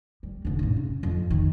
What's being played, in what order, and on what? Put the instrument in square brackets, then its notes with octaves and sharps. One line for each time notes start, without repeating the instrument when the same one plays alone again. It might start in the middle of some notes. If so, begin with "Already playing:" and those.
[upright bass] G3
F1 D3
A1 C#3
C#3
F2
D#3